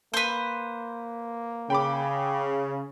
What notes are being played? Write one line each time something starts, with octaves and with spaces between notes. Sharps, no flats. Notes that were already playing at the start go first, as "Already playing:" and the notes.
A#3 B4 C5
C#3 G5 B5 D6